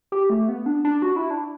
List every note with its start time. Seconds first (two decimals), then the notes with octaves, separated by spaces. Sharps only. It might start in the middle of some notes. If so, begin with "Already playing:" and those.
0.12 G4
0.30 A3
0.49 B3
0.66 D4
0.85 D4
1.02 F#4
1.16 E4
1.30 D4